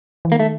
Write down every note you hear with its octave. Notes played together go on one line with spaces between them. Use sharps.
E3
D#3 A#3
A3